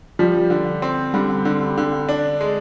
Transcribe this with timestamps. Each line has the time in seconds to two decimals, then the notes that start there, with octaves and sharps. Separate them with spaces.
0.19 F3 G3
0.50 D3
0.82 C4
1.14 D3 G3
1.45 D3
1.78 D3
2.09 D4
2.41 G#3